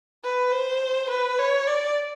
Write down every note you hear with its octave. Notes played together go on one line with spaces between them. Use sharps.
B4
C5
B4
C#5
D5